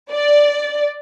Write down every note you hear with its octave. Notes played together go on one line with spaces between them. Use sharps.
D5